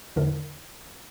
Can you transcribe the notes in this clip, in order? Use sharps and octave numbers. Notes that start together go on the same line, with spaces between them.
E2 A2 D3 E4 A#4